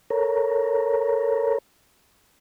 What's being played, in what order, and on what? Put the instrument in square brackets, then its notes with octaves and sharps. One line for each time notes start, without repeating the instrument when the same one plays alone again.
[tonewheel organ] A4 A#4 C#5 A#5